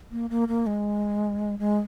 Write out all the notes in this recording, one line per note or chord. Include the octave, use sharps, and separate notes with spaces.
A#3
A#3
A#3
G#3
G#3